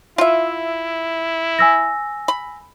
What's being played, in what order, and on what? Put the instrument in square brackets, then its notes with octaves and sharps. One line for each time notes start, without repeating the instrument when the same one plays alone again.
[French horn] E4 [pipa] F4 E5
[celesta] G#5 E6 A#6
[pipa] B5